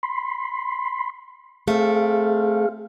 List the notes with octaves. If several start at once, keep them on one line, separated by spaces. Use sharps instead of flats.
B5 C6
A3 C4 G#4 F5